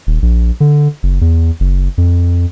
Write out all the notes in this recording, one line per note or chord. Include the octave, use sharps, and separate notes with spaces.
D#1
A#1
D3
F#1
E2
F#1
F2